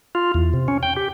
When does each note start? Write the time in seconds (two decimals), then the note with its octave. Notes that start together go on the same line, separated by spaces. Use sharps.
0.15 F4
0.34 E2
0.54 C3
0.68 C#4
0.83 G5
0.96 G4